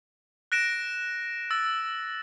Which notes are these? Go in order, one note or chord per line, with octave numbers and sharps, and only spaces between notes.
F#6 A#6 D7 E7
E6 A6